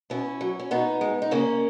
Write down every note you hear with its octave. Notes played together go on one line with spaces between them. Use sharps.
B2 C#4 E4
F#3
C#4
B2 B3 D#4
G#3
D#4
C#3 A#3 C#4